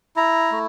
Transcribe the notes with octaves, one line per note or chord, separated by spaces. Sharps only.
E4 A#5
A3